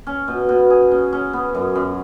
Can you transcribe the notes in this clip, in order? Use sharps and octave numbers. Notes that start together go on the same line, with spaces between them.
C#4
B2
B2
G#4
C#4
C#4
B3
F#2
F#2